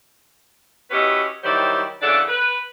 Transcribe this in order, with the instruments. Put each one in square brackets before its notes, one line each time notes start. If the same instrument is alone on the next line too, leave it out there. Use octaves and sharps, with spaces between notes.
[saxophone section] C#4 E4 F#4 G4 B4 D#5
D#3 F#3 G3 E4 C5 D5
C#3 E3 D4 A4 D5 F#5
B4